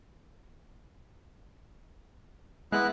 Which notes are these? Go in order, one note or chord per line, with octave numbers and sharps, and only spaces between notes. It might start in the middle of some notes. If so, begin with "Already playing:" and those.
G#3 B3 E4 F#6